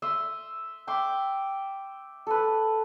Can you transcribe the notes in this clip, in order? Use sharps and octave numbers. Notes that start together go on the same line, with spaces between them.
E5 C6 D#6 E6
E5 G5 C6 D6
A4 B4